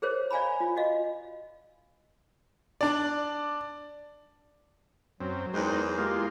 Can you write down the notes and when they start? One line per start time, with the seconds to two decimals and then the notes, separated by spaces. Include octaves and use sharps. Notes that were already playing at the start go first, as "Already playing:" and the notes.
0.02 G#4 A#4 C5 C#5
0.31 D5 F5 G#5 A#5 B5
0.60 F4
0.76 F#4 D#5 F5
2.81 D4 D5
5.20 F#2 F#3 C4
5.54 E2 G#3 D#4 G#4 A#4 C5 G5
5.98 G#3 A#3 E4 F4 G4